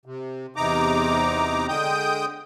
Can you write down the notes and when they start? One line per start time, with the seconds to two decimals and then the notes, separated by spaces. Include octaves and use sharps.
0.06 C3
0.56 E2 C3 D#4 A#5 D6
1.69 D3 G#3 G5 D#6 G6